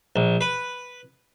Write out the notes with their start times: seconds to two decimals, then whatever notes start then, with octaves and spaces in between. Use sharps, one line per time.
0.16 A#1
0.41 B4